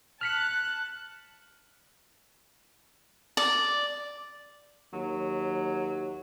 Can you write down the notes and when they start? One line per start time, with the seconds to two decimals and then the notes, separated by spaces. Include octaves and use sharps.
0.21 A5 F6 F#6 B6 C#7
3.37 D5
4.93 D#2 F#3